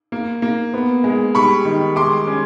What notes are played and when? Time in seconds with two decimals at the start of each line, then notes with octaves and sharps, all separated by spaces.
0.12 A#3
0.42 A#3
0.74 B3
1.04 G#3
1.35 G3 B5 C#6
1.65 D#3
1.96 G#3 C6 D6
2.27 C#4